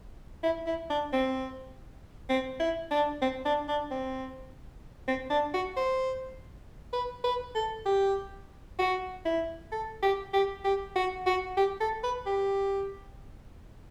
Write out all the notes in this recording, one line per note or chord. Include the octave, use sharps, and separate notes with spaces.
E4
E4
D4
C4
C4
E4
D4
C4
D4
D4
C4
C4
D4
F#4
C5
B4
B4
A4
G4
F#4
E4
A4
G4
G4
G4
F#4
F#4
G4
A4
B4
G4